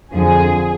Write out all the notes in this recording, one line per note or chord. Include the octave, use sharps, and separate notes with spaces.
F2 D3 F3 G#4